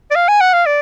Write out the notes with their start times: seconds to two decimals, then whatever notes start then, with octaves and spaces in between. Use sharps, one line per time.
0.11 D5
0.15 F5
0.28 G#5
0.41 F#5
0.53 F5
0.66 D5